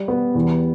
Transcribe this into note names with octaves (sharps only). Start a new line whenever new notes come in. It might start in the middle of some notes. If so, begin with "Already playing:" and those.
Already playing: G3
B3
E2